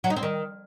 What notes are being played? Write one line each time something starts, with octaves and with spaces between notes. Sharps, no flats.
F#3
D#4
C4
D#3